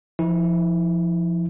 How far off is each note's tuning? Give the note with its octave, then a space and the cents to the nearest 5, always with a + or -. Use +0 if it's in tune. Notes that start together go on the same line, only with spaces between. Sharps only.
F3 -20 E4 -35